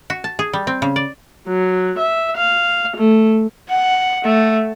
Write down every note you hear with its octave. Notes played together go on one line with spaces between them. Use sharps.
F#4
A5
G#4
G3
C4
C#3
D5
F#3
E5
F5
A3
F#5
A3